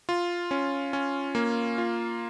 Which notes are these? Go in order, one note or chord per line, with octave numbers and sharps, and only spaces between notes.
F4
C#4
C#4
A#3
F4